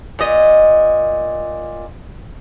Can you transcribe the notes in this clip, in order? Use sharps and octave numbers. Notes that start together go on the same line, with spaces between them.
A#2 D#5